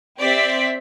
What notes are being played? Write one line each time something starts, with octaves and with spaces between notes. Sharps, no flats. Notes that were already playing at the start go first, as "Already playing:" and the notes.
C4 G4 C5 D5 E5 B6